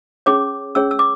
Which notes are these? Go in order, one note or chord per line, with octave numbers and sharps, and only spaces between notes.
C#4 G#4 C#5 D6
C#4 G#4 C#5 E6
E6
D6